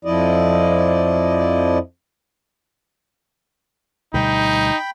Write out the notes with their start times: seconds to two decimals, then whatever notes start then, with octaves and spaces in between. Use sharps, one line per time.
0.05 F2 F3 E4 D5 D#5
4.14 D2 B2 G3 D#4 G5 B5